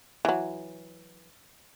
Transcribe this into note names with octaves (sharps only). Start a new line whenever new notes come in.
E3 F#3